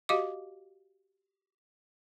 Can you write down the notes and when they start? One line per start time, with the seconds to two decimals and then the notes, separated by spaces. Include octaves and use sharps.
0.09 F#4 G4 D#5 F5 D6